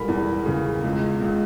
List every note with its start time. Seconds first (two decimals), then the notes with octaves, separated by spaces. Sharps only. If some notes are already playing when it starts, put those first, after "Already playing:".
Already playing: E1 G3 A#4 B5
0.08 E2
0.46 C#3
0.83 C#2
1.21 C#2